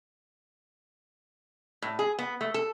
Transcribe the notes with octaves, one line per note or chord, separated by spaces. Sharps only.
A2
G#4
B3
A3
A4